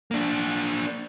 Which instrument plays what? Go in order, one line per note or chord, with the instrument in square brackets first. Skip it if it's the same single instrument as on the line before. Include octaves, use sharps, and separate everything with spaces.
[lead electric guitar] A#3 D4